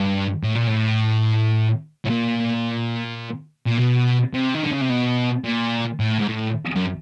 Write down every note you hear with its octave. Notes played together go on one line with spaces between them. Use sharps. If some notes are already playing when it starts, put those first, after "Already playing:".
Already playing: G2
A2
A#2
A2
A2
A#2
A#2
B2
C3
D#3
D3
C#3
C3
B2
A#2
A2
G#2
A2
F#2